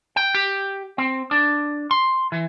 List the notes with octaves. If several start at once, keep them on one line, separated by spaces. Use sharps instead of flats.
G5
G4
C4
D4
C6
E3